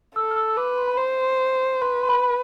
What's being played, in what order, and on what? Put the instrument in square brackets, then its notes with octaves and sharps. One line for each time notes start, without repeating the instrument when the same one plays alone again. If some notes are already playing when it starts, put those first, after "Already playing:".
[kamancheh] A4 [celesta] E6
[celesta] F6
E6
E6
[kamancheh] B4 [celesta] D6
[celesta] C6
B5
[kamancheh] C5 [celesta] C6
[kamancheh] B4 [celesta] C6
[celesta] C6
B5